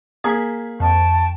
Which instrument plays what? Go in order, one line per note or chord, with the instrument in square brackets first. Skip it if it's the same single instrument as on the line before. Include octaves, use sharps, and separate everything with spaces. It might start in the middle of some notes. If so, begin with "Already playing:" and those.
[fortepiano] A#3 G#4 [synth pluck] G#6 B6
[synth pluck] F2 [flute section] G5 A5 C#6